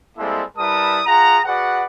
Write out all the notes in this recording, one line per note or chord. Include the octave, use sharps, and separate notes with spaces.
G3 G#3 A#3 C4 E4 A4
G3 E4 A#4 B4 A5 D#6
F4 G#4 F#5 A#5
F#4 G#4 B4 D5 F#5